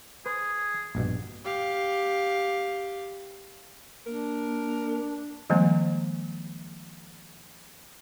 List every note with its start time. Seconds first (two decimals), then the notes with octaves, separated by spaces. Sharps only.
0.26 G#4 B4 C5
0.95 A#1 G2 B2
1.44 G4 F5
4.07 A#3 D4 A#4
5.50 D#3 F3 G3 G#3 A#3 C4